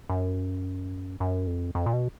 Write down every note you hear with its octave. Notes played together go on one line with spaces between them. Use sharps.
F#2
F#2
F2
F2
A#2
B2